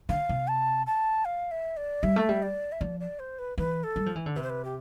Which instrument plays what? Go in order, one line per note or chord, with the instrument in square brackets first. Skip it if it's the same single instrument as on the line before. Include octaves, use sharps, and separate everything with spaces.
[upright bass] D3 [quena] F5
[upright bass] C3
[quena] A5
A5
F5
E5
D5
[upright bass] G3 [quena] E5
[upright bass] A3
G3
[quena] D5
E5
[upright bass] F3 [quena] D5
[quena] D5
C5
B4
[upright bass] E3 [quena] B4
[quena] A4
[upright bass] G3
F3
E3
D3
[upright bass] C3 [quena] B4
[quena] C5
B4
G4